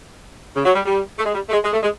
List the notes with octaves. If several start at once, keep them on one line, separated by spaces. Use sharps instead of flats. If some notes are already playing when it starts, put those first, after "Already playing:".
C#3
F#3
G3
G3
A3
G#3
G3
A3
G#3
G#3
A3
G#3